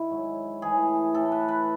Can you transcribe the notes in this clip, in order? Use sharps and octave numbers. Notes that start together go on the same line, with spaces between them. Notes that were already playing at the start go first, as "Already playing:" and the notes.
Already playing: D#3 E4
G#2 F#3
A2 E3 G#4
A2 E3 A4
B4
B4